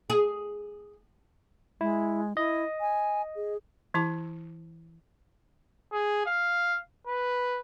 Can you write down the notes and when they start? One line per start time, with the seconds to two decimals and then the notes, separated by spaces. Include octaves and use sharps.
0.10 G#4
1.81 G#3 E4
2.37 E4 D#5
2.81 G#5
3.36 G#4
3.94 E3 E4 A5 D6
5.93 G#4
6.27 F5
7.07 B4